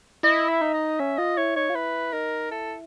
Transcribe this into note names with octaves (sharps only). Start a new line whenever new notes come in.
E4 D#5
E5
D#4
D#5
C#4 E5
F4 D#5
E4 C#5
D#4 C#5
F4
E4 B4
D#4 A#4
E4 A4